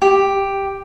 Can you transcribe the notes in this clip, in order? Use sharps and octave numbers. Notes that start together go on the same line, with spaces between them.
G4